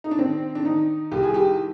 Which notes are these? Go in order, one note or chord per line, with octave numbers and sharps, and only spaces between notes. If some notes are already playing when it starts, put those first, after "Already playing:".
D#4
D4
D#3 C4
D4
D#3 D#4
C2 G4
G#4
G4